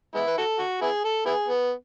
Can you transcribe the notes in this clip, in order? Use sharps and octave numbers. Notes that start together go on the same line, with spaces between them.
G#3 B3 E4
B4
F#4 A4
F#4
B3 E4 G#4
A4
B3 E4 G#4
B3